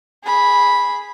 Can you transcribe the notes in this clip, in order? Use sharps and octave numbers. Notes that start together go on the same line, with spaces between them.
G#4 B5